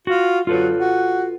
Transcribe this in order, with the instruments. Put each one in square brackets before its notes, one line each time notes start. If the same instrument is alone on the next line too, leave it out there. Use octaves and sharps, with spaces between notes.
[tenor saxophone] F4 [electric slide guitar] F#4
[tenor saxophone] F#3 [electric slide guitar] F4 A4 B4
[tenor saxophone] F#4